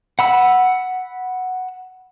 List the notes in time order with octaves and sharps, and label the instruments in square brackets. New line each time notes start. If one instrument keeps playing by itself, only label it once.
[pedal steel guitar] F#5 B5 E6